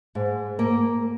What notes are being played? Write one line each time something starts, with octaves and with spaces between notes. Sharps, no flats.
G#2
A#3